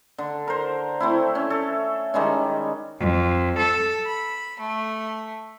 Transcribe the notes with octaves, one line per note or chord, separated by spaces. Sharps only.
D3
A#4 C5
A3 C4 E4
C#4
A4
D#3 G3 G#3 C#4
F2
A4
B5
A3